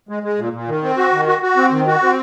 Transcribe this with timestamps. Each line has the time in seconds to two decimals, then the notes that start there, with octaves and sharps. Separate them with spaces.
0.09 G#3
0.23 G#3
0.38 A#2
0.53 A#2
0.68 D#3
0.83 C4
0.97 F#4
1.13 D#3
1.27 F#4
1.42 F#4
1.57 C4
1.72 D#3
1.87 F#4
2.02 C4